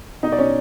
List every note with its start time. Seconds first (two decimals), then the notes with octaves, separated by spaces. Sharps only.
0.23 B2 D#4 D#5
0.32 D5
0.38 B2 C#4 C#5